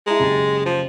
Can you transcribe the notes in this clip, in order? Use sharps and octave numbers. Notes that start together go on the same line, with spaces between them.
G#3 E4 A5 A#5
F#1 G4 A6
F3